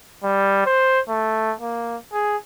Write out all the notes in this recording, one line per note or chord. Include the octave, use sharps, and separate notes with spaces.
G3
C5
A3
A#3
G#4